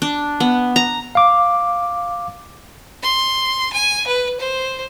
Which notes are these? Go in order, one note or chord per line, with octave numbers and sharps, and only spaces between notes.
D4
B3
A#5
F5 D6
C6
G#5
B4
C5